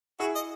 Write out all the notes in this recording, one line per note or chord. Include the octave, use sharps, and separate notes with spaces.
E4 F#4 G#4
D#5